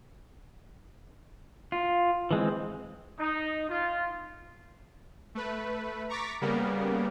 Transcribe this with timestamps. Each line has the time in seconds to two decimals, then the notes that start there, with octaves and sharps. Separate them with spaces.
1.72 F4
2.31 E3 G#3 C4
3.19 D#4
3.69 F4
5.35 A3 B4
6.09 A#5 C#6 D6 A6 B6
6.41 C#3 G3 A#3 B3 A#4